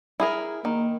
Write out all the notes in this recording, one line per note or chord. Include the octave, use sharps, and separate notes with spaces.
E4 G#4 A#4
D#3 A#3